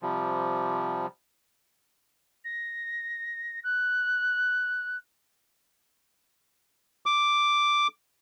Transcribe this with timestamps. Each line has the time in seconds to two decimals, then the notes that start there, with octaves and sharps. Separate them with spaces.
0.02 C3 F3 G3
2.44 A#6
3.64 F#6
7.06 D6